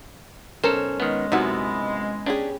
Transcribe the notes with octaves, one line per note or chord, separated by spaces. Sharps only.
B1 C#4 A4 A#4 C5
D#3 G#3 B3
F#2 C3 B3 D#4 E4 F#4
C#4 D4 G4 G#4